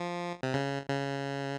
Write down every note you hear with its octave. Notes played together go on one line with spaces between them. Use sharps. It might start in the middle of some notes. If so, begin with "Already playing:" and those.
Already playing: F3
C3
C#3
C#3